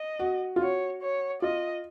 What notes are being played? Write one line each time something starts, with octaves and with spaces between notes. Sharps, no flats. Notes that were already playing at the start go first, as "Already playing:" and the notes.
Already playing: D#5
F#4
F4
F#4 C#5
C#5
F4 D#5